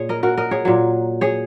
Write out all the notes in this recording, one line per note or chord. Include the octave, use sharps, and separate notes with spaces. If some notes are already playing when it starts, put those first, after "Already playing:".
Already playing: A#2 G#4 C#5
A#4 D#5
F#4 A#4
A#4 D#5
G#4 C#5
A#2 F#3
G#4 C#5